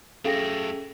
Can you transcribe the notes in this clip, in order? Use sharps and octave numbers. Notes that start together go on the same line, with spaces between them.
F#2 A3 C#4 G#4 A4 F5 G5 A#6